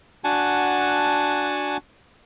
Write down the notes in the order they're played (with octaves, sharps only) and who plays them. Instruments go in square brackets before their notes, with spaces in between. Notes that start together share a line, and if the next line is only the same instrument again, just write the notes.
[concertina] D4 F#4 F#5 G#5 A5